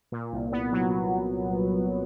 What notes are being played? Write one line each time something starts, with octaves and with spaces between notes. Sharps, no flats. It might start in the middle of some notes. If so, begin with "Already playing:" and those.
A#2
C2
B3
F#3